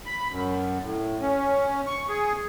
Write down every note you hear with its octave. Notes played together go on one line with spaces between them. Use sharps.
B5
F#2
A2
C#4
C#6
G#4